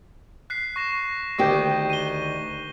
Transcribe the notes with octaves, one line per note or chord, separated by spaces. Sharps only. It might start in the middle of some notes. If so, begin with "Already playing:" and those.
F#6 B6 C7
C#6 A#6 E7
D2 D#3 G4 C#6 G6
D#7 G7